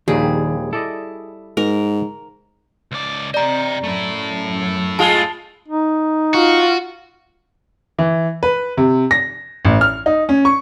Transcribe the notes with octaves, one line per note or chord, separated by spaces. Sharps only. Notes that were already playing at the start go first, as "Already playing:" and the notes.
A#1 D#2 D#3 G3 G#4
E4 A4 D5 D#5
G#2 A#4
C#2 D5
C3 D5 D#5 G5 A#5
F#2 A3 E4
G#3 F4 G#4 A5
D#4
F4 F#4
E3
B4
C3
A#6
A1
F6
D#4
C#4
C#6